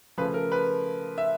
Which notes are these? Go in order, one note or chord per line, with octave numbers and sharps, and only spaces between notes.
C#3 F3 A3 B4
A#4
B4
E5